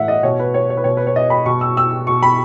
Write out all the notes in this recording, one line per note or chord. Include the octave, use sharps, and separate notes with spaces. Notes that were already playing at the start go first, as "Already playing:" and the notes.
Already playing: A2 E3 E5 F#5
D#5
B2 C#5
B4
C#5
C#5
B4
B2 C#5
B4
C#5
D#5
B5
B2 C#6
E6
E6
B2 C#6
B5